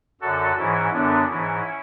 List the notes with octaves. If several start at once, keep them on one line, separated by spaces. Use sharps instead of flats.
F#2 D3 F#4 A4
G#2 E3 C#4 E4
F#2 D3 B3 D4
G#2 E3 C#4 E4